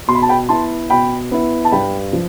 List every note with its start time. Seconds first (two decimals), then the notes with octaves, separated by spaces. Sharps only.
0.08 B2 C6
0.15 B5
0.22 A5
0.29 G5 B5
0.49 B3 E4 A5 C6
0.90 B2 G5 B5
1.31 B3 E4
1.65 A5
1.72 G2 G5 B5
2.13 F3